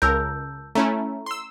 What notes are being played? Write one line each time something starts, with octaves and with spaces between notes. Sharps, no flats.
C#2 A#4 A5 E6 G6
A3 C#4 E4 A#5
C6 E6